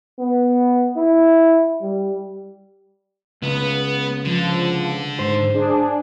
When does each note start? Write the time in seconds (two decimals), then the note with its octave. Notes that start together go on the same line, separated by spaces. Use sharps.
0.19 B3
0.96 E4
1.81 G3
3.42 C#2 B3
4.25 D3 F3
5.19 G#2 C5
5.54 D4 G#4